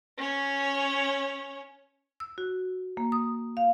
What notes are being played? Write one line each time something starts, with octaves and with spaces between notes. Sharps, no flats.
C#4 C#5
E6
F#4
A#3
D#6
F5